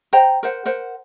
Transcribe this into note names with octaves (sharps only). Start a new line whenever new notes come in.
C5 D#5 G5 A#5
A#4 C5 F#5
A#4 C5 F#5